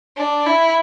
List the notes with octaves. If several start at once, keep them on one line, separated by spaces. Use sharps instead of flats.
D4
E4